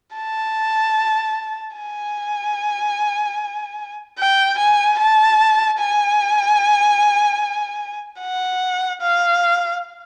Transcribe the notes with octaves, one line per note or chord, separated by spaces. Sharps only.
A5
G#5
G5
G#5
A5
G#5
F#5
F5